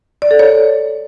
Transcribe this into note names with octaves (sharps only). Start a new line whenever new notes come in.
D5
A4
C#5